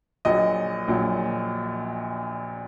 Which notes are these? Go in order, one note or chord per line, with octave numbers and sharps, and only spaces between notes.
A#1 A#2 F#3 D#5
A#1 A#2 F#3